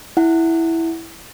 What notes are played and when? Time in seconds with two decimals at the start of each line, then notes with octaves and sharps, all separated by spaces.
0.17 E4 F#5